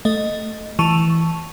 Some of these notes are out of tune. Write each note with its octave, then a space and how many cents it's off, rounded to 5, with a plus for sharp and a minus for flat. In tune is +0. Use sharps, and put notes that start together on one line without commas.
A3 +0 D#5 -5
E3 +0 A5 +0 C#6 +0